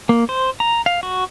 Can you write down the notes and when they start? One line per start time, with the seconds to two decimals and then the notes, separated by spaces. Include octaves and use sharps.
0.09 A#3
0.29 C5
0.60 A#5
0.86 F5
1.03 F#4